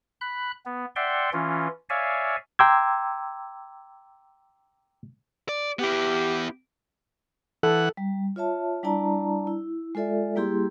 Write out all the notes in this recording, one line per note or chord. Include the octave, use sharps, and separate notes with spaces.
B5 F#6
B3
D5 E5 F#5 G5 C6
E3 C#4 F4
C#5 D5 E5 F5 G#5
G5 A#5 C6 D6 E6 G#6
D5
B3 E4 G4
E3 A4 F#5
G3
F4 C#5 E5 A5
G3 D4 E4 D5 A5 A#5
E4
G#3 F4 A4 D5 E5
G3 A#3 E4 G4 G#4 C6